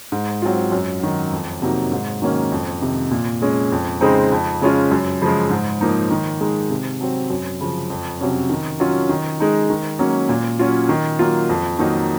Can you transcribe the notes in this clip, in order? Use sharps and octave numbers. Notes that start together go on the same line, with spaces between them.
G#2
F#3 C4 F4
F#2
D#3 F#3
F2
C3 F#3 A#3 D#4
G#2
D#3 F#3 A#3 C#4
F2
C3 D#3
A#2
G#3 C#4
F2
C#3 G#3 C4 D#4
F2
C#3 G#3 C#4 F4
F#2
C#3 F3 G#3
G#2
F3 A#3 D#4
D#3
G#3 D#4
C3
F#3 C4
F#2
C#3 F3
F2
C3 F#3 C#4
D#3
F#3 C#4 F4
D#3
G#3 D#4
D#3
F#3 A#3 C#4
A#2
F#3 C#4 F4
D#3
F#3 A#3 F4
F2
D#3 F#3 A#3 D#4